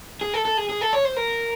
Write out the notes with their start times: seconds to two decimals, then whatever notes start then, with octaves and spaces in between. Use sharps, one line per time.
0.21 G#4
0.34 A4
0.45 A4
0.57 G#4
0.69 G#4
0.81 A4
0.93 C#5
1.05 C5
1.17 A#4